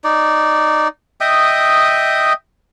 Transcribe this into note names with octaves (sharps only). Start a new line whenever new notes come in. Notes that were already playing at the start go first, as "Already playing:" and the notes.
D#4 D5
D#5 E5 G5 D#6